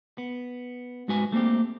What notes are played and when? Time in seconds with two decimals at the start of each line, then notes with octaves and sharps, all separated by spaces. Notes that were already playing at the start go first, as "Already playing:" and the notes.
0.18 B3
1.08 G#2 G#3 F#4 B4 G#5
1.32 A3 A#3 C4 D4 G4